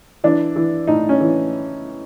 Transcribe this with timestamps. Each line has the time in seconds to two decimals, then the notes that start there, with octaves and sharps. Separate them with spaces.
0.24 E3 D4
0.56 E3
0.87 A2 D#4
1.09 C#4
1.20 E3